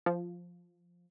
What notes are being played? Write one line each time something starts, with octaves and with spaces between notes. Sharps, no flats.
F3